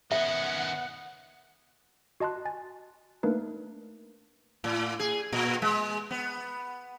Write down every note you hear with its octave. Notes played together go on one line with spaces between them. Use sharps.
D#3 B3 C#4 E5 F#5
F#4 D#5 A5 C6 F#6
G#5 A6
A3 A#3 D4 D#4 A#4 B4
A2
G#4
A#2
G#3
B3